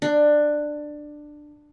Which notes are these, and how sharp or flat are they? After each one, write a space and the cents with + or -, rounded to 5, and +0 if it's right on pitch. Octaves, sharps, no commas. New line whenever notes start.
D4 +15